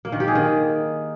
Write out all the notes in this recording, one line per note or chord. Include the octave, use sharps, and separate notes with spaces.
A#3
D#3
G4
G#4
D#3